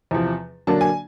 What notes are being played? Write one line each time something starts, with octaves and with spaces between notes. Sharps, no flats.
E2 C3 F3
D3 F#3 A#3 D4 A5
G#5